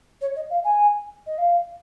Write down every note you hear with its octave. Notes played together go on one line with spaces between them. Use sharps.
C#5
D#5
F5
G#5
D#5
F5